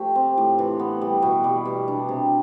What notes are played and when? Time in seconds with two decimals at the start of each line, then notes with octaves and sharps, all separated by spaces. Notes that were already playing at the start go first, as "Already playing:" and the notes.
Already playing: F3 A3 G4
0.15 C4
0.37 A2
0.59 E3
0.80 B3
1.01 G3
1.22 B2
1.44 G3
1.65 B2
1.88 D4
2.09 C3